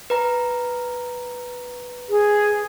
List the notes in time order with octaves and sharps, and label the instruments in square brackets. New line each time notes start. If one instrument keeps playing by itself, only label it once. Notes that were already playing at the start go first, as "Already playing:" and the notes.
[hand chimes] B4 A#5
[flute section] G#4